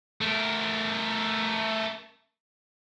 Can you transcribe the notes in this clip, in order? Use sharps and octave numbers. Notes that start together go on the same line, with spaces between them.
A3 A#4